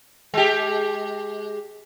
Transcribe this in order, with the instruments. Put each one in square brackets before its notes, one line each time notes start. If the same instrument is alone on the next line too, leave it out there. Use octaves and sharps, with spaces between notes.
[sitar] G#3 G4